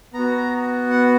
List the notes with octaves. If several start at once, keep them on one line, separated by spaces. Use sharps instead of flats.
B3 A#5
F#4
F#5